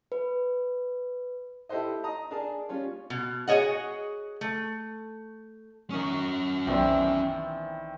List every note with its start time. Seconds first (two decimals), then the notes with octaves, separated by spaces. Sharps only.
0.12 B4
1.69 E4 G4 A4 C5 D#5
2.04 D#5 A#5 D#6
2.31 D4 G#4 A#4 A5
2.69 G3 C#4 F4
3.10 B2
3.48 F#4 G#4 C#5 D#5 F#5
4.41 A3
5.90 D#3 C#4 A#4 C#6 D#6
6.67 B1 D#3 E3 B3 C4 D5